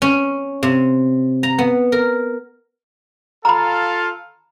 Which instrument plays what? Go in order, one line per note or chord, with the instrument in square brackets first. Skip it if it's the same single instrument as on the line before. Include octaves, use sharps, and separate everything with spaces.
[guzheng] C#4
C3
A#5
B3
A#4
[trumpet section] F4 A4 F5 [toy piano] A#5 B5